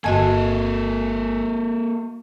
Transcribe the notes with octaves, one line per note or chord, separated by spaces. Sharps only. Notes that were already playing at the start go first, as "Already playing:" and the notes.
G1 A#3 F#4 A4 D#5 G#5 A5